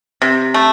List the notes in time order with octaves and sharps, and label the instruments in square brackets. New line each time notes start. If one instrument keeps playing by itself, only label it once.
[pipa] C3
A3